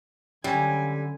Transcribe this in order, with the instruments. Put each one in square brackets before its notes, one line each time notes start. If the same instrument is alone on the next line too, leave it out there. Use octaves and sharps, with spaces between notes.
[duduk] D3 [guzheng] F#3 C#4 E4 [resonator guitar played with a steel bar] G3 [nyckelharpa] G#5